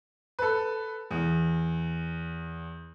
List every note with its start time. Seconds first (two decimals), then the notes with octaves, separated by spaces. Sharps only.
0.39 A4 B4
1.11 E2